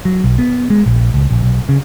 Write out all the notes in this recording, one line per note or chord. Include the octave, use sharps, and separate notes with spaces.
F#3
B1
B3
G#3
A#1
C#2
A#1
B1
C#3